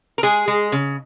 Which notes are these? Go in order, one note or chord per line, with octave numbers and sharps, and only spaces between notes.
A#4
G#3 G#4
G#3
C#3